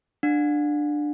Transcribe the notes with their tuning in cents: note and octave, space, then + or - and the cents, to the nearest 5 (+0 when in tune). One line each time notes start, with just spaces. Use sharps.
D4 +15 F#5 -45